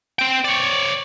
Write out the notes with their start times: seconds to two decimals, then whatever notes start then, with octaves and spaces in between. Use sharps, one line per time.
0.19 C4 G5
0.44 C#5 D5